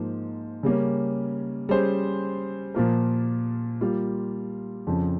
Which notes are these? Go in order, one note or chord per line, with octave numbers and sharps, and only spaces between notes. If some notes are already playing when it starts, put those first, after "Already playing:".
Already playing: G#2 F3 A#3
C#3 G3 A#3 C#4
G3 C#4 G#4 C5
A#2 F3 A#3 F4 A#4
G3 A#3 F4
F2 C#3 F3